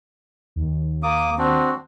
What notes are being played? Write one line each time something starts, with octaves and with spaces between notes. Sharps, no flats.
D#2
A#3 D6 D#6
C4 D4 F#4